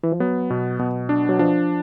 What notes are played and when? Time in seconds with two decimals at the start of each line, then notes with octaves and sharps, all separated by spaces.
0.04 E3
0.12 F3
0.20 F#3 B3
0.50 B2
0.79 B2
1.09 D4
1.29 F#3
1.39 F3 D4